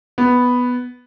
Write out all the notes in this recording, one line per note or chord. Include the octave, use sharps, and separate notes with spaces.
B3